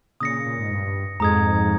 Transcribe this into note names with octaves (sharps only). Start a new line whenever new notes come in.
A#2 C#3 D#6 A#6 C#7
A#2
G#2
G2
F2 G#2 A#5 D#6 G#6